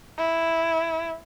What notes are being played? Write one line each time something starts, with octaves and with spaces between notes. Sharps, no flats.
E4